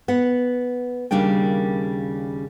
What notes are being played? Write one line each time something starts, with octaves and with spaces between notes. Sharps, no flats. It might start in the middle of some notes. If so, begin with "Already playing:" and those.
B3 F#5
D#2 C#3 G3 A#3 D4 G5